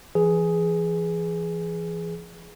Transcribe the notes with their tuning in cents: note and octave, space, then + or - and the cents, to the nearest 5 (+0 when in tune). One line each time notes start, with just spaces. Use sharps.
E3 +40 G#4 +5 B4 +0